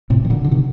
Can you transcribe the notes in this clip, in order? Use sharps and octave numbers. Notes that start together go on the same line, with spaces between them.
A2 C3
D#3
A#2 D3
D3
C3 D#3